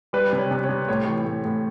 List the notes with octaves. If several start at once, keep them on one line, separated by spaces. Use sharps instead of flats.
G3 B4
C3
C#5
C3
C#5
C3
A2 C#5
E3
A2
A2